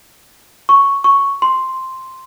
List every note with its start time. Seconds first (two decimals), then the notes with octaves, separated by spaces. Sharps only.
0.69 C#6
1.04 C#6
1.42 C6